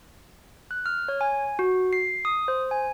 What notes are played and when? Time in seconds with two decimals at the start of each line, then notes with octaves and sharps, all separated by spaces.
0.71 F#6
0.86 F6
1.08 C#5
1.21 G#5
1.59 F#4
1.93 C7
2.25 D#6
2.48 C5
2.71 G#5